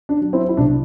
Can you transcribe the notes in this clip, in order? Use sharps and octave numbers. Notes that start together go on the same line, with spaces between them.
D4
F#3
C4 E4
E4
C2 D4